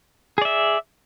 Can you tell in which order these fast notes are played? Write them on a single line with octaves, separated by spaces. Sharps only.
G#4 D5 E5